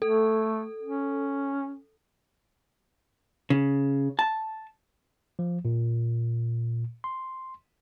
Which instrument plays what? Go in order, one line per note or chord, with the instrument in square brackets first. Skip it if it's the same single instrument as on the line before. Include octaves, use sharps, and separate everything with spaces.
[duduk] A3 [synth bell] A4
[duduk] C#4
[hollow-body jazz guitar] C#3
A5
[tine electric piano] F3
A#2
C6